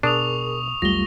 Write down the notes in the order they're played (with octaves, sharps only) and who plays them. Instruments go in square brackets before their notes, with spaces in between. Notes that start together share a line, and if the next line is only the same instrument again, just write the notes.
[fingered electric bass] B2 [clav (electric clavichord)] D4 [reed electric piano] G#4 A#4 [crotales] C#6 D#6 F7
[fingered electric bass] C2 F2 F#3 [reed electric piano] G3 A3 F4 [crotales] A#6 G7